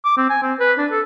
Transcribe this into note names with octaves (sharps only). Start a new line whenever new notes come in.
D6
C4
G#5
C4
B4
D4
A4